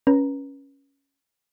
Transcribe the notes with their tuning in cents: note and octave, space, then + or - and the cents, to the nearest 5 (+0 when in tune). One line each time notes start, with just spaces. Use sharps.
C#4 +0 B4 -25 A#5 +0